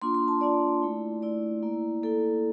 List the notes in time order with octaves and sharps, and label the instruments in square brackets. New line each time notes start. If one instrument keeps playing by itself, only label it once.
[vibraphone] A#3 D4 F4 C6
C6
A5
A#3 D4 F4 D5
A3 E4
A3 E4 D5
A#3 E4
A#3 E4 A4